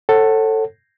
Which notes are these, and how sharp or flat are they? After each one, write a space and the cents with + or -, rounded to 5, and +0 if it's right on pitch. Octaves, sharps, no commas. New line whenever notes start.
A4 +10 C#5 -30 F#5 +20